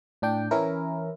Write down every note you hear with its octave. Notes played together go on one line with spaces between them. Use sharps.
A2 D4 G5
E3 C#4 E4 A#4